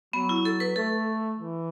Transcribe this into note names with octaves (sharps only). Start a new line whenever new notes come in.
F#3 B3
E4
A4
B4
A3 A4
E3